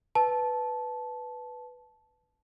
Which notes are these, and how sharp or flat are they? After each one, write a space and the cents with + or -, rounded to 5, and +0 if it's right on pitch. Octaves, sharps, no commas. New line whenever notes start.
B4 +0 A5 -15